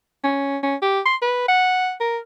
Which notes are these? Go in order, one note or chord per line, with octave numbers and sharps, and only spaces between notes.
C#4
C#4
G4
C6
B4
F#5
A#4